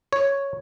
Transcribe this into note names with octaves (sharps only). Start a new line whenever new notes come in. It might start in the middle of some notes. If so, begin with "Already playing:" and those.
C#5